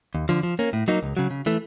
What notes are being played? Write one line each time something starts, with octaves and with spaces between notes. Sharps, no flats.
D#2
D3 F3
F3
A#3 C#4
A2
F#3 A#3 D#4
C#2
C#3 F#3
C#3
E3 A3